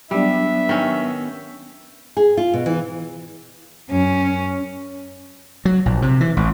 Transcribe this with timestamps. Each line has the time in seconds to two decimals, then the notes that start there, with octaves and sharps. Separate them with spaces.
0.11 F#3 G3 B3 D4 E5
0.69 D#3 C#4
2.17 G#4
2.37 F4
2.53 B2
2.66 E3
3.90 F#2 C#4
5.65 F#3
5.86 A#1
6.02 C3
6.20 E3
6.37 A1